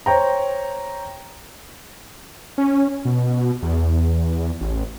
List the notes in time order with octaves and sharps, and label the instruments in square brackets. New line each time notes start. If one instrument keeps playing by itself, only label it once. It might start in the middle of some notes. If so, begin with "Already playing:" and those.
[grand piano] C5 C#5 G5 A#5
[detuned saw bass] C#4
B2
E2
A1